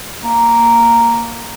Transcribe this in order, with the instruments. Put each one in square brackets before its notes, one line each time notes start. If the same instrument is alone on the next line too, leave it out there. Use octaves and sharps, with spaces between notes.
[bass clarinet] A#3